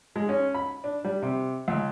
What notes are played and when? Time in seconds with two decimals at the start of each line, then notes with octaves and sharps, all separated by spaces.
0.16 G#3
0.29 C#4
0.54 B5
0.84 D4
1.04 G3
1.22 C3
1.68 C#2